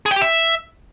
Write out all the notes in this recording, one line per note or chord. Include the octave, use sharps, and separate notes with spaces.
G#4
G5
G4
E5